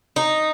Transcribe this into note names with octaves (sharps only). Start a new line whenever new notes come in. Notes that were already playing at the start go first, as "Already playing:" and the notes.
D#4